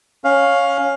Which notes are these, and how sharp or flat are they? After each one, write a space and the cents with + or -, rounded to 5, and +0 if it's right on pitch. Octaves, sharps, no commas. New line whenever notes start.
C#4 +0 F5 +10